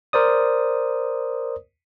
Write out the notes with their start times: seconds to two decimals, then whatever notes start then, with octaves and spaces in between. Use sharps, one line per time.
0.13 A#4 C5 D5 D#6